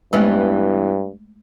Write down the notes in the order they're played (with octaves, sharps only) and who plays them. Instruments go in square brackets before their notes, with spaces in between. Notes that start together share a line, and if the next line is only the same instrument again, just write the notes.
[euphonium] G2 [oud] E3 B3 C#4 [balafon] G#3 A3